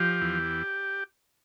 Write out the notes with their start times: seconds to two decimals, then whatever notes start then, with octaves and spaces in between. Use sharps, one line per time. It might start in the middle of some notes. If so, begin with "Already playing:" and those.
Already playing: F3 G4
0.21 E2